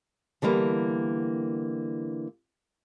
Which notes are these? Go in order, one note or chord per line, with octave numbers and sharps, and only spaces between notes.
D3 E3 G3 A#3 B3